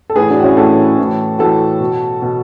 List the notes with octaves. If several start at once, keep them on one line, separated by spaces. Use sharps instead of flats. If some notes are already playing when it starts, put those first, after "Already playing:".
A4
A2 E3 G#4 B4
D4 F#4
F#4
C#4 E4
A2 E3 F#4 A4
A2 E3
A2 E3 F#4 A4
B2
B2